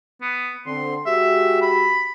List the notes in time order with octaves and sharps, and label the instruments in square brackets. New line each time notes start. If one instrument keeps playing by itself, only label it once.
[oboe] B3
[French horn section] D3 C4 [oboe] C6
[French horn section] G#3 F#4 G4 [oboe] E5
[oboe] B5